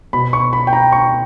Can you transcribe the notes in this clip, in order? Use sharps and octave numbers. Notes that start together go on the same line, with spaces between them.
B2 B5
C#6
B5
G5
A#5
C#6